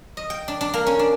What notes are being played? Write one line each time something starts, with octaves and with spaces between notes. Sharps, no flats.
D#5
G5
D4
D4
A#3
C#4
D4